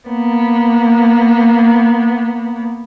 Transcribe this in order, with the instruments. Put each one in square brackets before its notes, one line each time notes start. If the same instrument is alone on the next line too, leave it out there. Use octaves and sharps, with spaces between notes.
[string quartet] A#3 B3